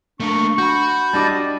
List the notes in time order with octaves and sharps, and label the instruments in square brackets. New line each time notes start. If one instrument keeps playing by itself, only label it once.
[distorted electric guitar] A3 A#3 [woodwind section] D4 C#6
[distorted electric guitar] F#4 [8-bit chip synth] B5 G6
[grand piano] G3 D4 D6 [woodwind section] D#5 A5